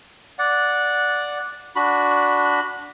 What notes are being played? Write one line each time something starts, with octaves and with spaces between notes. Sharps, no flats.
D5 F#5
D4 F#4 B5